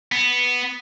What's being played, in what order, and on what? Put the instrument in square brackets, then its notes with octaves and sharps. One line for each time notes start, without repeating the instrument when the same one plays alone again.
[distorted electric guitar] B3